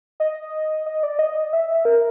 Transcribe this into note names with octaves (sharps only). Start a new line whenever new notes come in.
D#5
D#5
D5
D#5
E5
A#4